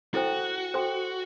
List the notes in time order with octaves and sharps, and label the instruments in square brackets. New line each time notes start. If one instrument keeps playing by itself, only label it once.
[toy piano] E4 A4 C5 G5 [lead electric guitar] F#4
[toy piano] A4 C5 G5 C6